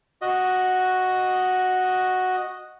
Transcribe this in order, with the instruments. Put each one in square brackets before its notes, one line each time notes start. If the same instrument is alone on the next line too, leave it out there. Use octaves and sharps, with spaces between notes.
[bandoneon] F#4 D#5